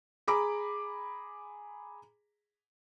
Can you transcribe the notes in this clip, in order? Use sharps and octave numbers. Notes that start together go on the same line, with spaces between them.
G#4 A#5 B5 D6